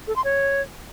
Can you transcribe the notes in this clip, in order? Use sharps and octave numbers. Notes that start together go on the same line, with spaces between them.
A4
C6
C#5